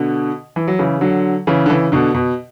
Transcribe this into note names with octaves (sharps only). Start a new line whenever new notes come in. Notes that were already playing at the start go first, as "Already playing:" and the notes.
Already playing: B2 D3
E3
F#3
C#3 E3
D3 F#3
C#3 E3
D3
C#3 E3
B2 D3
B2